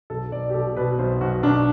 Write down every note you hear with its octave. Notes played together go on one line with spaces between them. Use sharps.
B1 A4
B1 D5
G4
B2 A4
B2 B4
B1 C5
B1 F#4
B1 D4